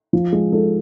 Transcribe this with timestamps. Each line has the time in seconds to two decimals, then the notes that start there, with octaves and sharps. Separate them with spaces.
0.13 F3
0.33 G#3
0.52 G#3 A4